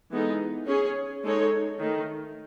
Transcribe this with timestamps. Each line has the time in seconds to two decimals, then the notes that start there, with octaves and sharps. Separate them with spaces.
0.10 E3 G#3 B3 D#4 A4
0.67 C#4 G#4 C#5
1.23 G#3 D#4 A4 C#5
1.80 D#3 A3 D#4